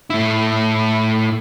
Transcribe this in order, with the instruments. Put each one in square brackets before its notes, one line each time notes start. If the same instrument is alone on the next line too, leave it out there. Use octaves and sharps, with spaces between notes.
[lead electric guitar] A2 E4